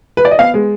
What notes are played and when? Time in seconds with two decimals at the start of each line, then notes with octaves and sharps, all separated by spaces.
0.17 B4
0.25 D5
0.31 D#5
0.39 B3 F5
0.54 G#3